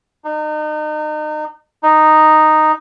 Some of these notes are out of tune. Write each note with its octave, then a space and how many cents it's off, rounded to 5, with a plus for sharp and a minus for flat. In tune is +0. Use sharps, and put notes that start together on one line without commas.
D#4 -35
D#4 -5